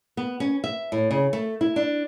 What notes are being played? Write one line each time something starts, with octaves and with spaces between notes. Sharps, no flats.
B3
C#4
E5
A2
C#3
A3
E4
D4